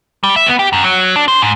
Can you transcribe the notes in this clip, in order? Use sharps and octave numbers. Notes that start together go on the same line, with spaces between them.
G3
E5
B3
G4
F#2
F#3
D4
C5
G#2